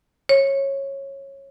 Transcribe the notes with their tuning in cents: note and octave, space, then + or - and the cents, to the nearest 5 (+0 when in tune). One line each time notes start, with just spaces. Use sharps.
C#5 -15